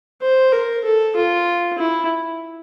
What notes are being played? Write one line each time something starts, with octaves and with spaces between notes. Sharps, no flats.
C5
A#4
A4
F4
E4